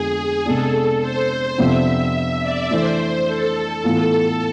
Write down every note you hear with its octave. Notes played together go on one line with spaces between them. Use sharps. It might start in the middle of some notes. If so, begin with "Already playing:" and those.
Already playing: F2 D3 F3 G#3 B3 G#4
C3 G#3 B3 D4 A4
A4
C5
F2 C3 F3 B3 D4 E5
D5
E3 A3 D4 C5
A4
A2 E3 B3 F4 A4